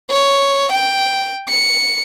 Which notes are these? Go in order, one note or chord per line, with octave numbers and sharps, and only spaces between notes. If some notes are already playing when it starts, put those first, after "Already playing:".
C#5
G5
C#7